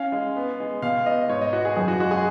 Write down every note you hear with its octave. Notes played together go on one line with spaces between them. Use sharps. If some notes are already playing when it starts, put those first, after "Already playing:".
Already playing: C#4 F5
G#3
B3
G#3
B2 F5
B3 D#5
G#2 C#5
D#5
B3 F#4
G#4
F#2 G#4
F#4
G#3 F#4
G#4